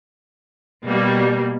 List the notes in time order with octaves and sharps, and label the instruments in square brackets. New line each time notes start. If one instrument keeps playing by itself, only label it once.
[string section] B2 G3 A#3